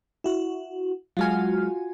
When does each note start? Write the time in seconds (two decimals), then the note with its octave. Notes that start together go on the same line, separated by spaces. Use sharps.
0.24 E4 F#4
1.17 F#3 G#3 F4 F#4 G#5 F6